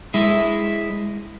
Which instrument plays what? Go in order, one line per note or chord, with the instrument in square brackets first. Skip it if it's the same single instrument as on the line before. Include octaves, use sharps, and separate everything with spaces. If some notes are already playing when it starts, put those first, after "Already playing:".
[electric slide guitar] G#3 E4